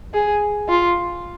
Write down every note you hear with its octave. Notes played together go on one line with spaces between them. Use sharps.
G#4
F4